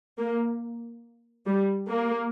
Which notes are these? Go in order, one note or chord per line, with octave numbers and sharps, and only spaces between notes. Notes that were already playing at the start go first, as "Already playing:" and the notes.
A#3
G3
A#3